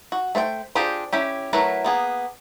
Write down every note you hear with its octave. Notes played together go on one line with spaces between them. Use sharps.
F#4
A3 C5 C#5 G5
D4 F4 G4 G#4 C5
C#4 E4 G4
F#3 A3 E4 A#4 B4
A#3 B3 G#4